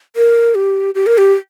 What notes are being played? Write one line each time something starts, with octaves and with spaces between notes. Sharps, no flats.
A#4
G4
G4
A#4
G4